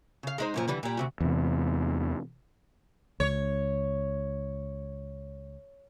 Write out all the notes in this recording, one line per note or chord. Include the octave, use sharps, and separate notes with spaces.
C#3 F5
G#3 D#4 C5
F#2 A#2 F3
D3 E3 G3
A#2 G3
D2 C3 F#4
E2 C3
C#2 C#5